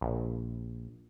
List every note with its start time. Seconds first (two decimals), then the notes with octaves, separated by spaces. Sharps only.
0.01 A#1